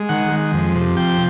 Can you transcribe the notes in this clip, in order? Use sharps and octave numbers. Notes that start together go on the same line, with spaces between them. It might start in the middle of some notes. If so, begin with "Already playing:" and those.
Already playing: G#3
D#3 F#5
G#3
F2
C3
F3 G5